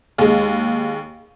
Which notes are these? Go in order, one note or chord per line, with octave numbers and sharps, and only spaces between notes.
D#2 G#3